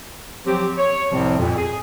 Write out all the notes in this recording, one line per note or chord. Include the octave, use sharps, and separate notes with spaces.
F3 F#3 C4 G4
C#5
C2 A2 C3 F3 G3 C4
F2 A#2
G#4